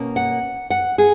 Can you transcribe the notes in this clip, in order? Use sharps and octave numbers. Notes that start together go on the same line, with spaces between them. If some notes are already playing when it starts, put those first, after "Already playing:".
Already playing: B2 A#3 C#4
F#5
F#5
G#4